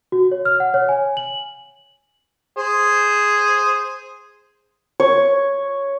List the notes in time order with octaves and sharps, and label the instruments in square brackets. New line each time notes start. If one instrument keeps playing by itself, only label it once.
[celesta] F#4
C#5
F6
F#5
C#5
G#5
F#7
[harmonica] G#4 C5
[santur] C#5